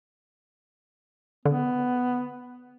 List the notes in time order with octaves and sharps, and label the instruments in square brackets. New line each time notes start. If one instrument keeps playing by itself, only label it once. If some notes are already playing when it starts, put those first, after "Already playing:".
[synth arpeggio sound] D3 [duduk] B3